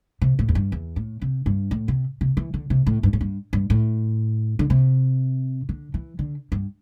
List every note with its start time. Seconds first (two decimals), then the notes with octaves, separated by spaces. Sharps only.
0.22 C3
0.39 A2
0.49 E2
0.55 G2
0.72 E2
0.96 A2
1.22 C3
1.46 G2
1.71 A2
1.88 C3
2.21 C3
2.37 E3
2.54 D3
2.70 C3
2.87 A2
3.03 G2
3.13 A2
3.21 G2
3.53 G2
3.70 A2
4.59 D3
4.70 C3
5.69 D3
5.94 E3
6.19 D3
6.52 G2